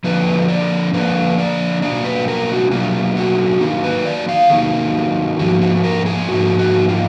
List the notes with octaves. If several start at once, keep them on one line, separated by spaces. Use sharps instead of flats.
D3 F3 A#3 D4 B4
D5
D3 F3 A#3 D4 B4
D5
B2 F#3 A#3 D4 D5
B4
A#4
F#4
B2 F#3 A#3 D4 F4
F#4
D#3 F#3 A#3 D#4
B4
D5
F5
D#3 F#3 A#3 D#4 G#4
G#2 F3 A#3 D#4 F#4
F#4
A#4
G#4
G#2 F3 A#3 D#4 F#4
F#4
F4